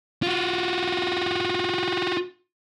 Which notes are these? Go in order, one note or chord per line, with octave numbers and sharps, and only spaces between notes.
F4 F#4